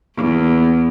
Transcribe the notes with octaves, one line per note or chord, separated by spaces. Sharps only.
E2